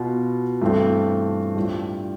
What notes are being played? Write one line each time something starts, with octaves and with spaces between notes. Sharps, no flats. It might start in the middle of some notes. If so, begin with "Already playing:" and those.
Already playing: B2 B3 F4
G2 E3 A3 C4
A2 G3 D4 F4